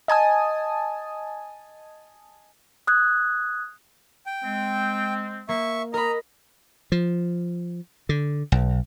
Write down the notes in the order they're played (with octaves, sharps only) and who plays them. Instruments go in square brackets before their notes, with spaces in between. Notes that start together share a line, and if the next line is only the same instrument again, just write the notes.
[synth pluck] D#5 G#5 A5 D#6
[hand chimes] D#6 F#6 G#6
[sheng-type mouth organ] G5
[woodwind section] G#3 C4
[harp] A#3 [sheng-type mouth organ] E5 C#6
[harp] A#4 B5 [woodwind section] D#5 [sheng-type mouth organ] A#5
[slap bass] F3
D3
B1